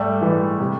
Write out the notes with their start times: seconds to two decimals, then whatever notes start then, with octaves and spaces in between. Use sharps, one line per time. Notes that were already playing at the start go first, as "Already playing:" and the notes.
Already playing: G#2 G3 A3
0.21 E3 G#3
0.60 C3